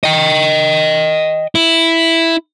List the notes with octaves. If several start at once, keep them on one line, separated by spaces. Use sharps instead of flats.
D#5 G5
E4